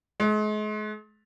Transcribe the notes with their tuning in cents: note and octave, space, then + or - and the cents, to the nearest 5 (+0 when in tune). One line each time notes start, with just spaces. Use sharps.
G#3 +40